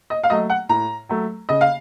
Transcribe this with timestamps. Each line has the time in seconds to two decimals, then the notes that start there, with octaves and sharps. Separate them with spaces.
0.10 D#5
0.24 F5
0.30 F#3 A3 D#5
0.50 F#5
0.69 A2 A#5
1.09 F#3 A3
1.49 C#3 D#5
1.61 F5